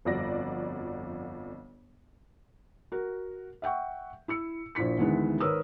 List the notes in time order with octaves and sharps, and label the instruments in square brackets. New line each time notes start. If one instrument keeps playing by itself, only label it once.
[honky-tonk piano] G1 F2 F#4 D5 A#6
[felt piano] F#4 A#4
E5 F#5 G5 C#6
E4 E6 C#7
A#1 A#2 E4 B6 C#7
D2 D#3 E3 G#3 B3
G#1 A#4 B4 C#5 D#6 E6